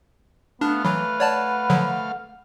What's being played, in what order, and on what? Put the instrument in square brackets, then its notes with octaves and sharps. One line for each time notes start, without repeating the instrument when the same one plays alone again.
[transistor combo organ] A3 F5 F6 [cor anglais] B3 [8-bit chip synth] D4
[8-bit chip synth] E3 F#3 [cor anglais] B4
[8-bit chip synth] C#5 D5 A5 [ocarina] F#5
[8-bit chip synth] D3 F3 F#3